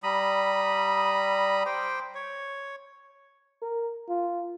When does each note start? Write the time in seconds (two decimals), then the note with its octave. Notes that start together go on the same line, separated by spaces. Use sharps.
0.03 G3 A#5 B5 D#6
1.66 C5 G5 D6
2.15 C#5
3.62 A#4
4.09 F4